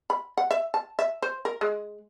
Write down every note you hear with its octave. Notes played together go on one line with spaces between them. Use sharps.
B5
F#5
E5
A5
E5
C5
A#4
G#3